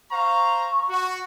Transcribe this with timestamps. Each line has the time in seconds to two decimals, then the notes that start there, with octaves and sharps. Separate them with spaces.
0.11 C5 F5 A#5 C#6
0.89 F#4